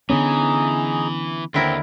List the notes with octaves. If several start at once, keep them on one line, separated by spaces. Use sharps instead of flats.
D3 E3 B3 C#4 D#4 G#4 A#5
D#2 D3 C4 E4 A#4 C6